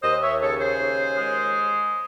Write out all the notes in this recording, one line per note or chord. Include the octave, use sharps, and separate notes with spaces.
D#2 C5 D#5
C#5 E5
C#3 A4 C#5
G#4 C5
D#2
G#3